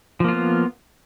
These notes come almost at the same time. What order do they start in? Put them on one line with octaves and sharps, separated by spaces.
F3 A#3 F4 B3